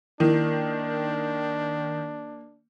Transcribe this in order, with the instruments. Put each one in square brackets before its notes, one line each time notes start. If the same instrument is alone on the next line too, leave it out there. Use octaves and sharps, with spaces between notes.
[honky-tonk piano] D#3 [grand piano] A#3 [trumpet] D4 [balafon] E4